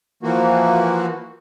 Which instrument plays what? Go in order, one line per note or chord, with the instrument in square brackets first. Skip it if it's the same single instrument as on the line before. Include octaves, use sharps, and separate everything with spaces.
[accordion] E3 F3 A#3 F#4